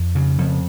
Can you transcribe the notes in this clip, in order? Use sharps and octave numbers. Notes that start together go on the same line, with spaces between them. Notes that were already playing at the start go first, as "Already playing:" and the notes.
Already playing: F2
C#3
F2